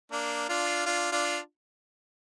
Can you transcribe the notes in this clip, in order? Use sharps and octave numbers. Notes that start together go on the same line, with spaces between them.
A#3 D4
D4 F4
D4 F4
D4 F4